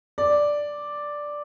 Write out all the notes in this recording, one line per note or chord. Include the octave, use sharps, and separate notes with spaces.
D5